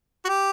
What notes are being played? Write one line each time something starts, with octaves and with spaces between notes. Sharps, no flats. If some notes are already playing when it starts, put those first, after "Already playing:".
F#4
G4